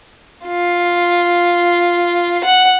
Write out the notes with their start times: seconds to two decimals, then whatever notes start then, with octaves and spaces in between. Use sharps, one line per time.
0.46 F4
2.44 F#5